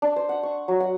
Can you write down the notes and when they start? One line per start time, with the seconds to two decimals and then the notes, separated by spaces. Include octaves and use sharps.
0.02 D4
0.16 C5
0.29 F#5
0.43 C#6
0.68 F#3
0.80 F#5